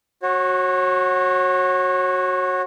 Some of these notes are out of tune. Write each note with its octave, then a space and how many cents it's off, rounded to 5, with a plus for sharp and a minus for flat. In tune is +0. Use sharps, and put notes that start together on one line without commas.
F#4 +0 C#5 -30